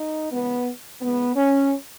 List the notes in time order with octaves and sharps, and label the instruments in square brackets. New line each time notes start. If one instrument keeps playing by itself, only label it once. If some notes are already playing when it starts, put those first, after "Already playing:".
Already playing: [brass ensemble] D#4
C#3 E3 G#3 B3
C#3 E3 G#3 B3
C#4